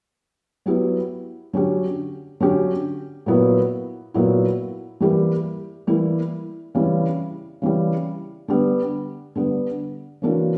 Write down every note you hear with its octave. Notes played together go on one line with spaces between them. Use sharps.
F#3 B3 E4 G4
D3 F#3 C#4 G4
D3 F#3 C#4 G4
A#2 F#3 B3 E4
A#2 F#3 B3 E4
E3 G3 A#3 E4 G4
E3 G3 A#3 E4 G4
C#3 E3 G3
C#3 E3 G3
D3 G3 B3
D3 G3 B3
C#3 E3 A#3 D4 F#4